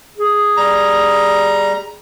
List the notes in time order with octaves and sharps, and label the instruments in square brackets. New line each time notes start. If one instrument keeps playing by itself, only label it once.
[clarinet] G#4
[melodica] G3 A#5